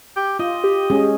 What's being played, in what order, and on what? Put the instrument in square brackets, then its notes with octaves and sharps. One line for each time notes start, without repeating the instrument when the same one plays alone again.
[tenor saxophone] G4
[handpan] F4 [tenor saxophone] D#5
[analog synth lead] G4
[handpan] G#3 C#4 G#4